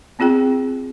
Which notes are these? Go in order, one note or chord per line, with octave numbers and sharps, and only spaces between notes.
B3 C4 F4 G#4 G5